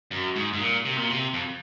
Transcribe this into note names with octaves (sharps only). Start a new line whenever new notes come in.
F#2
G#2
G#2
A#2
C3
A#2
C3
F2